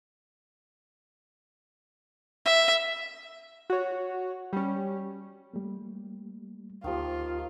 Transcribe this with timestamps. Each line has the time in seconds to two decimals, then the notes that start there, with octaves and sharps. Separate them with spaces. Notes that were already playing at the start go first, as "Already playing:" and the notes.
2.46 E5
3.70 F#4 C#5
4.53 G3 C#4
5.54 G3 A3 A#3
6.84 D2 D#3 F3 A#3 F4 G4